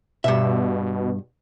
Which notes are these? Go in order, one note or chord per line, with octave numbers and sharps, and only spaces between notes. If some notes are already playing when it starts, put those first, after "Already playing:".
G2 B2 E5